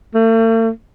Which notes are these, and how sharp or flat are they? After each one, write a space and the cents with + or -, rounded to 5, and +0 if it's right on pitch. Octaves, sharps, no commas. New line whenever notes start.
A3 +45